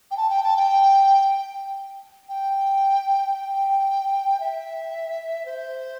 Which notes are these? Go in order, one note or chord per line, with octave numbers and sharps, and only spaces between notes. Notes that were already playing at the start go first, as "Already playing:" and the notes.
G5
A5
G5
A5
G5
G5
G5
E5
C5